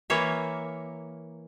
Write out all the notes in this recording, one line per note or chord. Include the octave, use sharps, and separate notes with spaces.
E3 A#3 C#5 E5